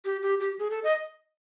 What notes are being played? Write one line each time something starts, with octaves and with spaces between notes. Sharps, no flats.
G4
G4
G4
G#4
A4
D#5